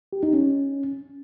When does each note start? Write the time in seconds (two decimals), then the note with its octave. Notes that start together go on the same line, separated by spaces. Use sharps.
0.13 G4
0.23 D#4
0.33 C#4